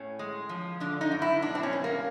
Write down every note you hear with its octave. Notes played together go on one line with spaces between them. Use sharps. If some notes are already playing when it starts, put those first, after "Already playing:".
Already playing: A2 C#4
G#3
F3
D3 D4
D#4
F#2
E4
B2 D4
C4
C#4
G3
A#3